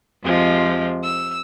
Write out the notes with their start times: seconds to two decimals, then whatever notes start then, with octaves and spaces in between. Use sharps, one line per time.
0.22 F2 C3 F3 G#3
1.03 E6